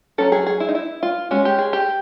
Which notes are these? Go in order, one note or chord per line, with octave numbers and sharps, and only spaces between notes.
F#3 A3 C#4 A4
G#4
G#4
E4
D#4
E4
F4
G#3 C#4 F#4
G4
G#4
G4